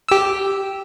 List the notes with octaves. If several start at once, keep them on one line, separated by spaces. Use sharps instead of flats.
G4 E6